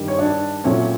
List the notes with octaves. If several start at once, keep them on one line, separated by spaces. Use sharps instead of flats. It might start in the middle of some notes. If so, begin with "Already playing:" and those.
Already playing: G2 D#3 G3
C#5
D4 D5
A#2 F#3 A3 C4 C#4 C#5